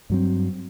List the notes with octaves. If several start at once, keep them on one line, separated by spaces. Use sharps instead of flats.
G2 F#3 C4